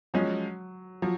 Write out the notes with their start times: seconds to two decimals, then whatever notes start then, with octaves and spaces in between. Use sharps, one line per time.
0.14 F3 F#3 G#3 C#4
1.02 F3 F#3